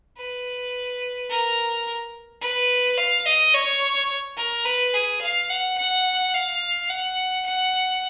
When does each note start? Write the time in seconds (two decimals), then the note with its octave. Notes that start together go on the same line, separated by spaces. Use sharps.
0.17 B4
1.30 A#4
2.41 B4
2.97 F5
3.26 D#5
3.54 C#5
4.37 A#4
4.65 B4
4.94 G#4
5.21 F5
5.50 F#5
5.78 F#5
6.34 F5
6.89 F#5
7.46 F#5